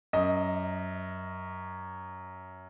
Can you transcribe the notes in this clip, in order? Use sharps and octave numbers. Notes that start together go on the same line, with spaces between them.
F#2 D#5